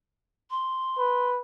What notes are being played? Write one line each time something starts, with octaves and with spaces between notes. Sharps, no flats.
C6
B4